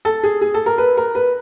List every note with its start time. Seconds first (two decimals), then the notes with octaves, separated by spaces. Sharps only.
0.05 A4
0.23 G#4
0.41 G#4
0.54 A4
0.66 A#4
0.78 B4
0.97 A#4
1.15 B4